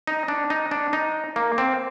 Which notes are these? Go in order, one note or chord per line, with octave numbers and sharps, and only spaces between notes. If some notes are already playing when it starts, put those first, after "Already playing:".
D#4
D4
D#4
D4
D#4
A#3
C4